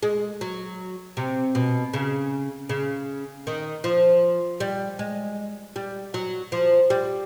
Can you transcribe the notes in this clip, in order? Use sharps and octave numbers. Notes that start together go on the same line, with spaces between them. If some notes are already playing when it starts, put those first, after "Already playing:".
G#3
F#3
C3
B2
C#3
C#3
D#3
F3
G3
G#3
G3
F#3
F3
G3